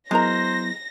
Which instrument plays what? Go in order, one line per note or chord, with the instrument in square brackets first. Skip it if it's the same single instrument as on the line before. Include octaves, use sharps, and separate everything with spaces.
[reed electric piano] F#3 B3 E4 [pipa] G#3 A#4 A#5 [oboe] C5 [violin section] A#6